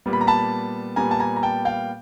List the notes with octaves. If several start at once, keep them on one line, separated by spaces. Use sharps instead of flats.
A#2 G3 B3
B5
A#5
A5 B5
A#2 G3 B3 G#5 A#5
A5
G#5 A#5
A#5
G5 A5
F5 G5